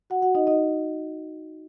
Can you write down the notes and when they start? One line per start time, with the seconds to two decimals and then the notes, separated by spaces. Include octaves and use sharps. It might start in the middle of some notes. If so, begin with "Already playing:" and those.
0.10 F#4 F#5
0.22 F#4 F#5
0.35 D#4 D#5
0.47 D#4 D#5